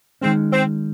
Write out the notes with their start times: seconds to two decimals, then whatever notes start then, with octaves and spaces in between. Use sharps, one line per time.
0.21 D#3 G#3 C4 C#4
0.53 C4